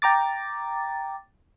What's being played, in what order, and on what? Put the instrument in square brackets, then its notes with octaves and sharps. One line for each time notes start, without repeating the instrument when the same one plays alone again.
[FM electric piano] G5 A#5 D6 A6